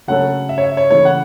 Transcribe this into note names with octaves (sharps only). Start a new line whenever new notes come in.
C#3 F#3 A3 C#4 A4 F#5
E5
C#5
E5
C#5
C#3 E3 A3 C#5
F#5